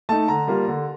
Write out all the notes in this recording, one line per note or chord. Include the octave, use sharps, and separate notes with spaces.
A3 D#4 A5
D3 A#5
G3 A#3 F4
D3